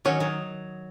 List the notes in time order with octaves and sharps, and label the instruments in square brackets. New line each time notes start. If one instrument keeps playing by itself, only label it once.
[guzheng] D#3 F#3 [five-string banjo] C#4 F#4 C#5
[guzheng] D#3 F#3